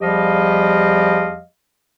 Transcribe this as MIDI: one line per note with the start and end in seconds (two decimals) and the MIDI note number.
0.01 1.41 40
0.01 1.41 53
0.01 1.41 55
0.01 1.41 67
0.01 1.41 75
0.01 1.41 77